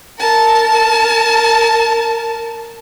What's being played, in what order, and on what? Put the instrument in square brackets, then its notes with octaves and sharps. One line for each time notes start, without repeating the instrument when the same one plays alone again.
[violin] A#4 A5